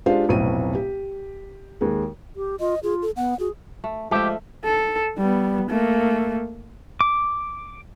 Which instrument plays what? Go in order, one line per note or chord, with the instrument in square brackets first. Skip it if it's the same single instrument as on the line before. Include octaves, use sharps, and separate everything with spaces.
[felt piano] G#3 D4 F4 G4 C5 F5
F1 B1 A2 C4 D#7
G4
D#2 G#3
[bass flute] G4
[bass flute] F4 [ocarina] D#5
[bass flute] F4 [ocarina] G#4
[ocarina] A4
[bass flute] B3 [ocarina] F#5
[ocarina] F#4 [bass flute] G#4
[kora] A3
[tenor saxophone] F3 [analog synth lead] G#3 [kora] A3 E5 [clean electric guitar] G4
[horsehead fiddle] A4
G3 B3
A3 A#3
[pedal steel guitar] D6